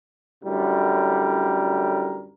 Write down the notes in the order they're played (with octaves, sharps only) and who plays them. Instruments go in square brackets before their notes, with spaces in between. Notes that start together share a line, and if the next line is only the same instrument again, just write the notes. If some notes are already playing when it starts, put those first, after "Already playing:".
[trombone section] F#2 A2 D3 G3 A#4